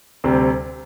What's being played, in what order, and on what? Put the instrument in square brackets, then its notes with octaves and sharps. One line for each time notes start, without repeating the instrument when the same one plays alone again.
[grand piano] D2 C3 G3